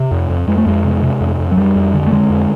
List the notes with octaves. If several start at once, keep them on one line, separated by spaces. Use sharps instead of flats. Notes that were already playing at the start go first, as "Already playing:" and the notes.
Already playing: C3
F2
F2
F2 G#3
A3
F2 G#3
C3
C3
F2
F2
F#3
F2 G3
F2
D3
A3
D3 G#3
F2